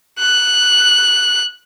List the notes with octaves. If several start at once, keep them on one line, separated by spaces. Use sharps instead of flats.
F#6